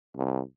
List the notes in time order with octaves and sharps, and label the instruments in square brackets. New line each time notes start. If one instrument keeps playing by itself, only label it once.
[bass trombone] C2